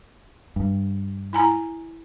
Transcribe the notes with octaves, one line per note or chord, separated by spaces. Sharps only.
G2
E4 G#5 A#5